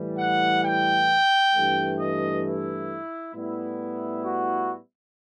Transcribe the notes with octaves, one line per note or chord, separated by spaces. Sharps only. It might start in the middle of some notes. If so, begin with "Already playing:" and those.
Already playing: A2 E3 G3
F#5
G5
G2 E3 A3
D#5
E4
A2 G3 B3 E4
F#4